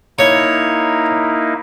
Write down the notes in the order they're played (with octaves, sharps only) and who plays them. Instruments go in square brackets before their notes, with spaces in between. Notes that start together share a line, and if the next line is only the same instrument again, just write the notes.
[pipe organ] A#3 D#4 E4 [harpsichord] C#5